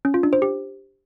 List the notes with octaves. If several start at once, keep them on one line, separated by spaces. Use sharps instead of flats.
C#4
F4
D4
C5
G4